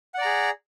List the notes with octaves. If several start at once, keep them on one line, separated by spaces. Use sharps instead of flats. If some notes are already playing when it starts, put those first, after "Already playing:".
G#4 D5 F#5 A#5